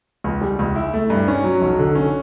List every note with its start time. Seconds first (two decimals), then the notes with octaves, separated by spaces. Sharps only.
0.24 C#2
0.41 G3
0.59 C#2
0.76 E4
0.94 A3
1.10 G2
1.28 C#4
1.44 F#3
1.62 B1
1.79 D3
1.95 C#4